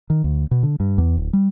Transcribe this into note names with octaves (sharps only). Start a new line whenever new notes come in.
D#3
D2
B2
D3
G2
E2
D1
G3